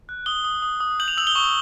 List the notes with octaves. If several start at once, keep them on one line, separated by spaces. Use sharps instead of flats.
F#6
D#6 G7
D#6
D#6
D#6
G6 F#7
F7
E6 F#7
G7
C#6
G7